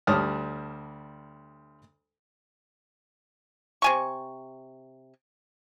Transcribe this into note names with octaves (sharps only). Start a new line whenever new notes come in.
D2 G3 C#5 A5 D#6 F6
C3 G#5 C#6